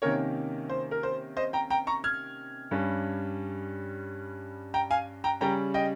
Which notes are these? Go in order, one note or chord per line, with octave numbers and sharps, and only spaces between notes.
C3 D#3 A#3 C#4 A#4 C#5
C5
A#4
C5
C5 D#5
G5 A#5
G5 A#5
A#5 C#6
F6 G#6
G2 G3 C#4
G5 A#5
F5 G#5
G5 A#5
C#3 G3 C#4 G5 A#5
D#5 G5